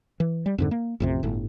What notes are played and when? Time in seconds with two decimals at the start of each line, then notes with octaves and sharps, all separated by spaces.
0.20 E3
0.46 G3
0.58 F2 G#2 D3
0.71 A#3
1.00 A1 F2 C3
1.23 G1 A2